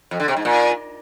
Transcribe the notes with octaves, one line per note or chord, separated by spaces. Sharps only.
F2
D3
C3
G#2
A#2